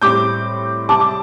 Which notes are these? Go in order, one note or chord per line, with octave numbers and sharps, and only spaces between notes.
A2 G3 C4 D6 G6
C3 G3 C4 A5 D6
D6